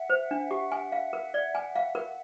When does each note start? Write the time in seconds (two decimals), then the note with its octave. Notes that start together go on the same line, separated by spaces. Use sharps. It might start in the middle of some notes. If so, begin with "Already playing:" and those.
Already playing: E5 F#5
0.10 C5
0.31 D4
0.51 G4
0.72 G#5
0.92 F5
1.13 A#4
1.34 D5
1.55 G#5
1.76 F5
1.95 A#4